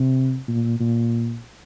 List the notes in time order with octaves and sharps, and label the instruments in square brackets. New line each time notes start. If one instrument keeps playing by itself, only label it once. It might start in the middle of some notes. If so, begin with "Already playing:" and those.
Already playing: [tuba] C3
A#2
A#2